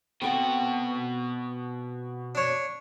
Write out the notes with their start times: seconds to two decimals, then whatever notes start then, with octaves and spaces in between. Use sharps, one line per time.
0.22 B2 C4 F#4 A4 D6
2.35 D4 C#5